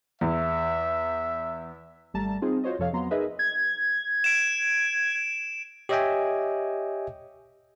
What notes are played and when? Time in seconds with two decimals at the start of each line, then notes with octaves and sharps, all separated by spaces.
0.21 E2 E5
2.14 G#1 G3 A3 A5 A#5
2.42 C4 D#4 F4 G#4
2.64 F4 F#4 C5 C#5 D#5
2.79 F2 C3 F3 A4 C#5 F5
2.93 F2 F#3 B3 A#5 C6
3.11 D#4 G#4 A#4 B4 D#5 E5
3.39 G#6
4.24 D7 E7
5.89 G4 C#5 D#5 E5 G5 G#5